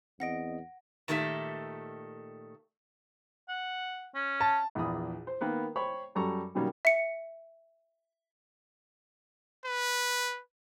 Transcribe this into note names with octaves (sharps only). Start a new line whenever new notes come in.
E2 C4 D#5 F#5 A#6 D7
A#2 D#3 A3 G4 E5
F#5
C#4
A5
A#1 E2 E3 B5 D#6
C5
D#3 A#3 B3 B4
C5 C#5 G5 B5 C#6
F#2 F#3 G3 A4 A#5 C#6
B2 D#3 F#3 G3 A#3 C#4
E5 C#7
B4